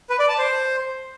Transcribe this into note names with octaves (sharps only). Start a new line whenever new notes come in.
B4
D5
A5
C5